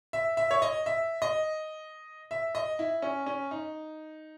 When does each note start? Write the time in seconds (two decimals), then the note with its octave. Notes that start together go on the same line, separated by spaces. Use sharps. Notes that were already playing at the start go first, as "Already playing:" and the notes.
0.13 E5
0.37 E5
0.51 C#5
0.62 D#5
0.86 E5
1.22 D#5
2.31 E5
2.55 D#5
2.79 E4
3.02 C#4
3.26 C#4
3.51 D#4